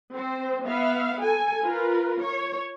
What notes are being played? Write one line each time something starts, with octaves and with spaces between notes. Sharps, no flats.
C4 C5
B3 E5 F5
A4 G#5
F4 A#4 B4
C#5